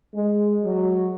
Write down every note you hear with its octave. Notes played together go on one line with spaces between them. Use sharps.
G#3
F#3